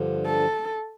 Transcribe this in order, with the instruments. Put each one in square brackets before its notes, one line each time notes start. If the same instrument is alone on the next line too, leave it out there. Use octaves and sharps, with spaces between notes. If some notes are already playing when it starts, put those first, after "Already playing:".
Already playing: [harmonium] G2 D3 F3
[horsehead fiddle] A4